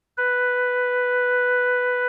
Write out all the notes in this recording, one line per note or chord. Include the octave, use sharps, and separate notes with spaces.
B4